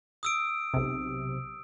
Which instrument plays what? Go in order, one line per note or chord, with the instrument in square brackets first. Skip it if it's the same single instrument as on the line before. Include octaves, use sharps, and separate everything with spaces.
[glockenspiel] D#6 E6 D7
[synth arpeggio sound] B1 C3